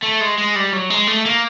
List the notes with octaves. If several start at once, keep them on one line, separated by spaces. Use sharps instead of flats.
A3
G#3
G#3
G3
F#3
G#3
A3
A#3